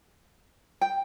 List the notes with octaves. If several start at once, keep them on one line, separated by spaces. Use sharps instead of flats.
G5